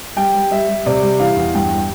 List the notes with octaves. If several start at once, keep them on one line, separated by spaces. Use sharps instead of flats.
G3 G5
G3
G3 E5
G3
C3 D5
G3
E3 F5
E2
G2 G5
G3